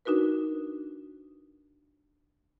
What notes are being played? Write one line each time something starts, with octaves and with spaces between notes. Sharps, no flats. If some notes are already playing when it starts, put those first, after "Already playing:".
D4 D#4 F#4 A#4 B4